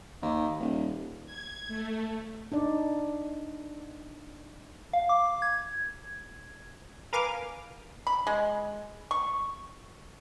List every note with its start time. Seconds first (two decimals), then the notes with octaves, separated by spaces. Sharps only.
0.22 D#2
0.60 D#1
1.26 G#6
1.68 A3
2.52 D4 D#4 D5
4.93 F5
5.09 D6
5.42 G#6
7.13 A#4 B4 F5 G#5 D6 F6
8.07 B5
8.27 G#3
9.11 C#6